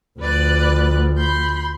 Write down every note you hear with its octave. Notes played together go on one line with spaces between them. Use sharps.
D2 F3 B4 D5 F#6
B5 C6 G6